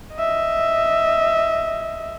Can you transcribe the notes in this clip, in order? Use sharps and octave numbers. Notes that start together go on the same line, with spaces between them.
D#5 E5